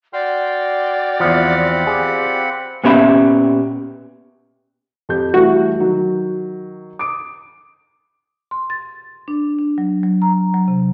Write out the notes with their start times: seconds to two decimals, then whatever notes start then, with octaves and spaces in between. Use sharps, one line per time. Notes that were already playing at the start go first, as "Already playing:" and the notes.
0.13 F#4 D5 G5 C6 F6
1.20 E2 F3 C4 F#5 B5
1.87 F4 G4 G#4
2.84 A#2 B3 C#4 G4 E5 B5
5.09 F2 G4 G6
5.34 E3 G3 A3 F#4
5.80 D#3 F#3
6.99 D6 D#6 D7
8.51 C6
8.70 A6
9.28 D4
9.59 D4
9.78 F#3
10.03 F#3
10.22 A#5
10.54 F#3
10.68 C3